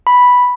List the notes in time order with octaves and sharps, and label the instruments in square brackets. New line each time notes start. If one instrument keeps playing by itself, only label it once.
[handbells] B5